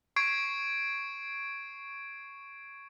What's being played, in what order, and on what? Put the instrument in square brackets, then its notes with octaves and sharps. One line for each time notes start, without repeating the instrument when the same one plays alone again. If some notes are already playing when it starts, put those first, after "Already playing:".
[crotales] C#6 G#6 C7 D7